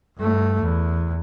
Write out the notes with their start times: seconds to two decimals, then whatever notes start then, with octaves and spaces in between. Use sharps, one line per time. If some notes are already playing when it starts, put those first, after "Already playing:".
0.17 G2 A3
0.61 E2